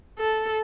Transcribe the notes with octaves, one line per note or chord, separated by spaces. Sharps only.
A4